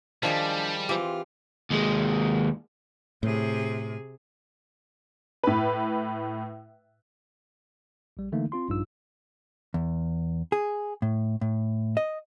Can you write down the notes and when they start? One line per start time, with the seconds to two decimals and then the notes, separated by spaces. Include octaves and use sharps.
0.23 D#3 F3 G3 D4 E4 G#4
0.89 E3 C4 F4 G4
1.71 D#2 G#3
3.23 A2 C3 G#4
5.43 A2 B4
8.17 A#1 G3
8.32 D3 E3 A3 A#3 D#4
8.52 C4 F4 C6
8.68 A#1 G2 D#4 F4 E6
9.74 E2
10.52 G#4
11.02 A2
11.41 A2
11.97 D#5